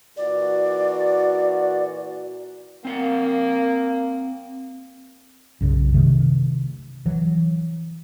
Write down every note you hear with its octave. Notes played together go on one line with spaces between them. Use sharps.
A#2 E3 F#4 D5
A#3 C4 F5 F#5
B1 F#2 C#3
C3 D#3 A3
E3 F#3